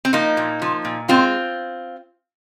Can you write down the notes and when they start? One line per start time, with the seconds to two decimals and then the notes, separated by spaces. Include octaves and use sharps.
0.05 C4
0.13 F3 A#3 D#4
0.37 A#2
0.62 F3
0.85 A#2
1.08 G#3 C4 F4